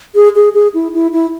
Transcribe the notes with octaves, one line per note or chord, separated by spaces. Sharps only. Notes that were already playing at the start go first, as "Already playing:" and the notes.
G#4
G#4
G#4
E4
E4
E4